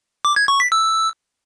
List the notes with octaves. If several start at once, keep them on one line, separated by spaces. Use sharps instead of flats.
D6
G#6
C#6
B6
E6